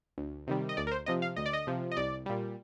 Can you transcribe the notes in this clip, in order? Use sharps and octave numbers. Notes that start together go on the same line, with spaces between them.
D2
C3 D#3 G3
D#5
D2 D5
A#4
C5
C3 F3 D#5
F5
D2 D#5
D5
D#5
C3 F3
D#5
C2 D5
A#2 G3